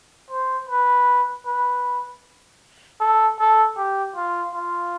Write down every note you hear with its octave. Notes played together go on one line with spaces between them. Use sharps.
C5
B4
B4
A4
A4
G4
F4
F4